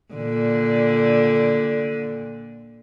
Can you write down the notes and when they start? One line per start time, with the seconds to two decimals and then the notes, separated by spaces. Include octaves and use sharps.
0.14 A#2 D3